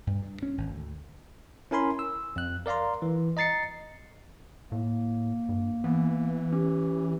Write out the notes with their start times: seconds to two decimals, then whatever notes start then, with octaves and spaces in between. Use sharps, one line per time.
0.07 G2
0.22 G2
0.43 C#4
0.58 G#1
0.69 D2
1.71 C#4 E4 A#4 G#5 B5 C6
1.99 E6
2.36 F2 F#6
2.66 A#4 D5 F5 A#5 C6
3.02 E3
3.37 D#5 A#5 A6 C7 C#7
4.72 A2 A#3
5.49 G2
5.84 E3 B3
6.52 C#4 G4